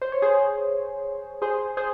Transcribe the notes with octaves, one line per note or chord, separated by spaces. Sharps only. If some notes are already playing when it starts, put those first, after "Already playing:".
C5
C#5
G#4 C5
G#4 C5
G#4 C5